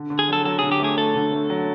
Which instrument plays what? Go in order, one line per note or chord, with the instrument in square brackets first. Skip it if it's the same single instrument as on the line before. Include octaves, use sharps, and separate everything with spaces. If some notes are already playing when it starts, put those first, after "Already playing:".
Already playing: [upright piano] D3
D3
[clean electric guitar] G#4
[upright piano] F#3 [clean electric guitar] A4
[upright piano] F#3 [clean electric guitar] A4
[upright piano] D3 [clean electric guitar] G#4
[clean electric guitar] G4
[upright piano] A3 [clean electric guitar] G#4
[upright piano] A3 [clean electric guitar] A4
[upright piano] D3
A3
F#3